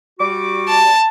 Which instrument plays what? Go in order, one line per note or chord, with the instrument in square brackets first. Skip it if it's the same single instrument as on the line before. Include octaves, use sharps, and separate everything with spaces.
[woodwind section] G3 F#4 D6
[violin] A5